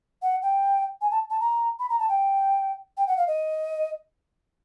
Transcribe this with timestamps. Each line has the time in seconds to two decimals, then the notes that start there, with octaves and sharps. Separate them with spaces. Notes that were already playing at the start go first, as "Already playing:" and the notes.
0.22 F#5
0.42 G5
1.01 G#5
1.11 A5
1.30 A5
1.40 A#5
1.79 B5
1.89 A#5
1.99 A5
2.09 G5
2.97 G5
3.07 F#5
3.17 F5
3.27 D#5